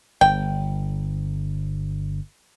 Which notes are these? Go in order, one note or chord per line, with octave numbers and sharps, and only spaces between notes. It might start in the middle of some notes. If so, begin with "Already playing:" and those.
G1 G5